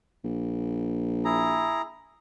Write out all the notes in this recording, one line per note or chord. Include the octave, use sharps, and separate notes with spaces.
A#1
E4 G#4 A#5